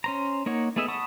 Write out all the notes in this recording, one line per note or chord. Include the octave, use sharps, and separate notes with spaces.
C#4 C5 A#5
A#3 D#4 C#5 F#5
A3 B3 G#4 D#5 E5
F#5 A5 B5 C#6 D#6